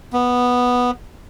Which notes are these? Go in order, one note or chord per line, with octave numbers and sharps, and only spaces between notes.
B3